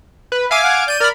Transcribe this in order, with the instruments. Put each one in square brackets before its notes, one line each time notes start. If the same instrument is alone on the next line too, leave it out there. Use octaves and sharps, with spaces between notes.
[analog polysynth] B4
[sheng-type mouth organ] E5 [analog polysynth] F5 G#5 D6
[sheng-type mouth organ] F#5
[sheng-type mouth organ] D5 [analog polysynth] G6 D#7
[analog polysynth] A#4 B5 [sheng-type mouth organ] D5 F6